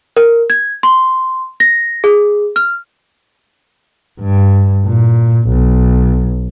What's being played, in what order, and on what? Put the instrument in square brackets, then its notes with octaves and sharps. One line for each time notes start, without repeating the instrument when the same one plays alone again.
[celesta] A#4
G#6
C6
A#6
G#4
F6
[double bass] G2
A#2
B1